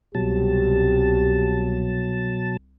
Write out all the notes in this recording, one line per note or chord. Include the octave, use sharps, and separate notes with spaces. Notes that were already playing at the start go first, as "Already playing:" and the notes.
C2 B2 F#3 G4 A5